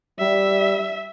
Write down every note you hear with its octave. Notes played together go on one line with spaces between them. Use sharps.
G3 E5